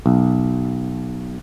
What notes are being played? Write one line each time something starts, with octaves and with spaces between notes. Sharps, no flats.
B1